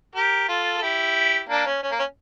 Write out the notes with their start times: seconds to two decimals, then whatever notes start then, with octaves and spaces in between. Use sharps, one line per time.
0.15 G4 A#4
0.48 F4 A4
0.77 A4
0.82 E4 G4
1.49 A#3 D4
1.66 C#4
1.83 C#4
1.91 A#3
1.99 C#4